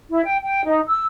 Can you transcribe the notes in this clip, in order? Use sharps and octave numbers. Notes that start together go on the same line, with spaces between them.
E4
G5
G5
D#4
E6